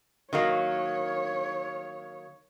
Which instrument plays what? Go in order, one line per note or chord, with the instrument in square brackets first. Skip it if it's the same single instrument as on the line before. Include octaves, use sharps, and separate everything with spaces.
[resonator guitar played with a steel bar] D#3 F#3 A#3 [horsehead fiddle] C#5